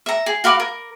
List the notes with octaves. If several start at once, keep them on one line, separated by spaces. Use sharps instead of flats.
E5 A#5
G#4
F#4 F5 B5 D6
A#4